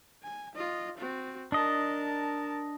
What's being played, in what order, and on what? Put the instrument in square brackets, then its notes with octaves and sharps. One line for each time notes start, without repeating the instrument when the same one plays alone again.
[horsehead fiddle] G#5
F4 D#5
C4 F#4
[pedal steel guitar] D4 D#5 [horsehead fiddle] A#4 A5